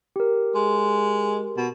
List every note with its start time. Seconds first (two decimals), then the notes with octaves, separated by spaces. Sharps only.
0.16 G4 A#4
0.55 G#3
1.57 B2